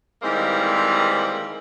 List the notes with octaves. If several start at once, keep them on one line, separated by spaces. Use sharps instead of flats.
D#3 E3 G3 G#3 A#3 C4